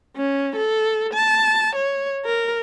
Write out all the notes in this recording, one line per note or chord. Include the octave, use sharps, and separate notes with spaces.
C#4
A4
A5
C#5
A#4